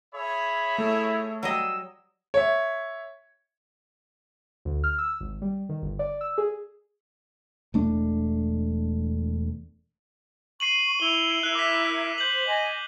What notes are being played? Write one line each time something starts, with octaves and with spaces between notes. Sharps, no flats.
G#4 C#5 E5 B5
A3 E4
F#3 G3 D#5 E6
C#5 E5
D2
F6
E6
G#1
G3
D#3
G1
D5
E6
G#4
E1 A3 D4
C#6 C7 D#7 F#7
E4 F7 G7
E4 A#4 F#6
D6 B6
C5 G6 F#7
D#5 G#5